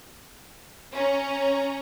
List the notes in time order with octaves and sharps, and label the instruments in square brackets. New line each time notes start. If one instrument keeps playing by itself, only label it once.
[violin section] C#4 A#5